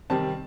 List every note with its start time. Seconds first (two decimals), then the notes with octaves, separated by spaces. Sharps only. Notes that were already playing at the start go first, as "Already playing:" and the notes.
0.10 C3 D#3 G3 C4 A5